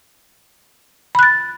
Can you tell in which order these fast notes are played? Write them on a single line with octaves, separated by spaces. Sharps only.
B5 F#6 A6